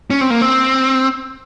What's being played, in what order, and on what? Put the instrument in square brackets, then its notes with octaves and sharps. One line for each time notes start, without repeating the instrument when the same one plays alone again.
[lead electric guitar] C#4
C4
A#3
C4